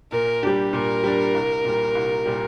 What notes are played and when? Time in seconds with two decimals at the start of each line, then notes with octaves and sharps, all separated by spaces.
0.12 A#2 A#4
0.43 G3 D4 G4
0.73 A#2 A#4
1.04 G3 D4
1.34 C2
1.65 A#2 G3
1.95 C2
2.26 A#2 G3